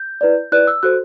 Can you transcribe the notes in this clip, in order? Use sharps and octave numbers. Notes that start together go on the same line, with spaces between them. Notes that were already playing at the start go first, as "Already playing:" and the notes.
Already playing: G6
E4 B4 D5
E4 B4 D5 F#6
E6
F#4 A4 C5 F#6